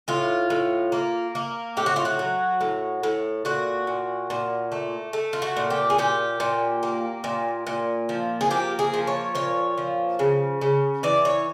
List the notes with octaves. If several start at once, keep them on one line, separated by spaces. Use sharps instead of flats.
A2 F4
A2
A#3
A#3
A2 G4
F#4
F4
F#4
F#3
A2
A2
A#2 F#4
A#2
A#2
A3
A3
F4
F#4
A#2
G4
G#4
A#2 G4
A#2
A#3
A#2
A#2
F3
G#4
A#3 G4
G#4
F3
C#5
A#2 C#5
F3
C#3
C#3
E3 D5
C#5